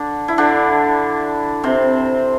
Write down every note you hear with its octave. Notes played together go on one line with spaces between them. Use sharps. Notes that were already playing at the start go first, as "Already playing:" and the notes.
Already playing: D3 D4
E4
D3 D4
C3 C4